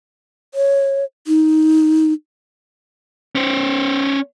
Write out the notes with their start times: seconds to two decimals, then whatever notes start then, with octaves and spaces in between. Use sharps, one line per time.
0.54 C#5
1.27 D#4
3.35 C#4 C5